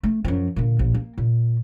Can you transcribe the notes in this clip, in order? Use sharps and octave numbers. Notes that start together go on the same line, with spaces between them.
A3
F#2 F3
A#2 D3
A#1
A#3
A#2